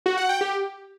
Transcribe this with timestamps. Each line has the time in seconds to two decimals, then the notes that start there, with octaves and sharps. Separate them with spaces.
0.06 F#4
0.17 F#5
0.29 G5
0.41 G4